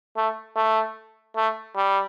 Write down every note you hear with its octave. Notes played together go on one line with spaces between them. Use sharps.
A3
A3
A3
G3